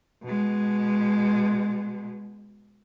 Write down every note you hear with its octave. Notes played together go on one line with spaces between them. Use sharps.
B2 G#3